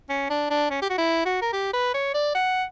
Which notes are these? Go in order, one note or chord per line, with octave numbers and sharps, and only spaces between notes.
C#4
D4
D4
C#4
G4
F#4
E4
F#4
A#4
G4
B4
C#5
D5
F#5